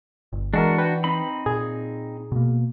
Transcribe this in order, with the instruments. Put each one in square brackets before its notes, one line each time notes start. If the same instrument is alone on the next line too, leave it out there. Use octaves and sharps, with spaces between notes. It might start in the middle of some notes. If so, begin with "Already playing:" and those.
[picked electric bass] G1
[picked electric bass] E3 [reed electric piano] G#3 A#4 [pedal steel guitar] D4 F#4
[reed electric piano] B4 G5
[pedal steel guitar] C4 D#4 B5
[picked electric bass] A#2 [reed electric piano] G#4
[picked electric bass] B2 A#3